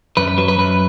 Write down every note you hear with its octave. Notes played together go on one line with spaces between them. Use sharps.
F#2 B4
B4
F#3 B4
B4
F#2 B4